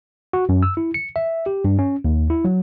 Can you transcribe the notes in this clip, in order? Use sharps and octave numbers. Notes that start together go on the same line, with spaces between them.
F#4
F#2
E6
E4
C#7
E5
G4
G2
C#4
D#2
E4
F#3